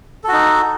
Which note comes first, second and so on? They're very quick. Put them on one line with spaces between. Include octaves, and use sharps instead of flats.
A4 F#4 D#4